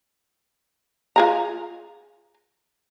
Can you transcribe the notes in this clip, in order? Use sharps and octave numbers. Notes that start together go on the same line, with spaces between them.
F4 G#4 A#5